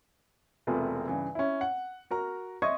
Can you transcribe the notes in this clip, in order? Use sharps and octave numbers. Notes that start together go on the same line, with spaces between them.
E1 C3 A3 F4 G#4 B4
G2 C#3 E3
C#4 E4
F#5
F#4 A#4 A#5
D#5 E5 C6 C#6 D#6 G#6